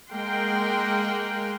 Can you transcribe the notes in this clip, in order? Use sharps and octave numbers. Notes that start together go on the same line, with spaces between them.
G#3 A#3 A#4 F#5 G5 C6